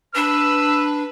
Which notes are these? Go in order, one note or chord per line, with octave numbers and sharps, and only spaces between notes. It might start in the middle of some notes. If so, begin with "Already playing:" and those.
D4 B4 E6